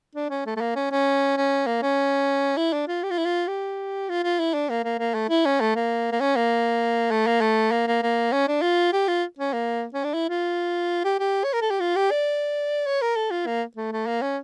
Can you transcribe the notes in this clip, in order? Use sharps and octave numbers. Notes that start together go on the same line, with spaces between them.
D4
C#4
A3
A3
A#3
C#4
C#4
C#4
A#3
C#4
E4
D4
F4
G4
F4
E4
F4
G4
F4
F4
E4
D4
A#3
A#3
A#3
A3
E4
C#4
A3
A#3
A#3
C#4
A#3
A3
A#3
A3
A#3
A#3
A#3
C#4
D4
F4
G4
F4
C#4
A#3
C#4
D4
E4
F4
G4
G4
C#5
A#4
A4
G4
F4
G4
D5
C#5
A#4
A4
F4
A#3
A3
A3
A#3
C#4